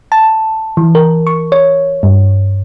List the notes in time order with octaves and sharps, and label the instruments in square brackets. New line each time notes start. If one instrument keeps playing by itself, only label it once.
[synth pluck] A5
E3
A#4
C#6
C#5
G2